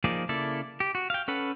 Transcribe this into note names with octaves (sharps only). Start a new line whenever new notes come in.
F3 A#3 D#4 G#4 D5
C#3 A#3 E4 A4 D5
G4
F#4
F5 G5
C#4 A4 B4 F#5